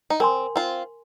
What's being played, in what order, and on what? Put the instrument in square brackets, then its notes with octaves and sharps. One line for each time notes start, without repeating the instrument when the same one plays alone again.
[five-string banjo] D#4
[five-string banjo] C4 [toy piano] A#4 G#5 C6
[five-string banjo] C4 F4